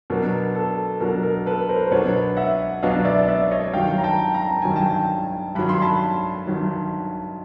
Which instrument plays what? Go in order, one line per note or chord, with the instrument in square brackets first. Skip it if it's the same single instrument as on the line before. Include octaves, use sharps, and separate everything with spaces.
[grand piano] B2 F#3 B3 D4 [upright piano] A#4
[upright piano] A4
[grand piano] B2 F#3 B3 D4 [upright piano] A#4
[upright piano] A#4
A4 B4
A#4 C5
C5
[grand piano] B2 F#3 B3 D4 [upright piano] B4 C#5
[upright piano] E5 F#5
[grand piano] B2 F#3 B3 D4 [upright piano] D#5 F5
[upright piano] D5 E5
D5 E5
C#5 D#5
[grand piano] G2 D#3 F#3 [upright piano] F5 G5
[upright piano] A#5
G5 A5
A#5
A5
[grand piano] G2 D#3 F#3 [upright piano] G#5
[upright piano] G5 A5
[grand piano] G2 D#3 F#3 [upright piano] B5
[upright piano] C6
A5 B5
[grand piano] G2 D#3 F#3